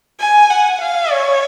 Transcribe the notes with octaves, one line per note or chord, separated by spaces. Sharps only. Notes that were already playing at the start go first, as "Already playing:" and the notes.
G#5
F#5
F5
C#5